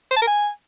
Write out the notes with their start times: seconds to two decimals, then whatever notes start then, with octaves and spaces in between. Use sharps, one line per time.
0.11 C5
0.16 A5
0.22 A#4
0.27 G#5